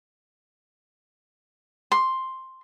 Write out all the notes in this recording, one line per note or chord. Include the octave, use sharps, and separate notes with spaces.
C6